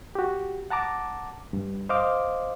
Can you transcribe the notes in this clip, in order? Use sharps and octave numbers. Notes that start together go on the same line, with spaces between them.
F#4 G4
F#5 A5 A#5 D6
G2
C5 D#5 F5 D6